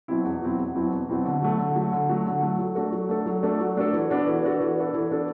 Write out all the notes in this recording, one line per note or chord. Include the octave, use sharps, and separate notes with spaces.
B2 F#3 C4 E4
E2
B2 F#3 C4 E4
E2
B2 F#3 C4 E4
E2
B2 F#3 C4 E4
D3
F#3 A3
D3
F#3 A3
D3
F#3 A3
D3
F#3 A3
F#3
A3 D4 F#4 A4
F#3
A3 D4 F#4 A4
F#3
A3 D4 F#4 A4
F#3
A3 D4 F#4 A4
E3
B3 D4 F#4 A4
E3
B3 D4 F#4 A4
E3
B3 D4 F#4 A4
E3
B3 D4 F#4 A4